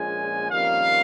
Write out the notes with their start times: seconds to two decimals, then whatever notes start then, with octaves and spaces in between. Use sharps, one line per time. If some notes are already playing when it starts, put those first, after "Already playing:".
Already playing: A#1 A#2 G#3 C#4 G#5
0.51 F2 D#3 G3 A#3 C#4 F5